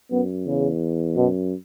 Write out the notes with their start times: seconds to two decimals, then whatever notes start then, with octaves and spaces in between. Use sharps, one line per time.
0.11 F#2 B3
0.47 E2 C#3
1.16 F#2 B2